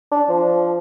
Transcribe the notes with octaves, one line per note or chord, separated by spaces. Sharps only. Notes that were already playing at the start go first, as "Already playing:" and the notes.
D4
F3